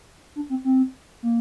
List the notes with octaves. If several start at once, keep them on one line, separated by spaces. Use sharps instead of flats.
D4
C4
C4
A#3